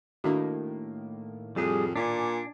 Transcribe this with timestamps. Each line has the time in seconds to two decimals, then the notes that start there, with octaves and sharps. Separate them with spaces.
0.24 A2 D#3 A#3 D4 F#4
1.56 F2 G3 G#4
1.96 A#2 D4 G#5